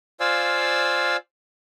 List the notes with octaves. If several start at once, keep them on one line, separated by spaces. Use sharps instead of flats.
F4 C5 D5 F5 G#5 E6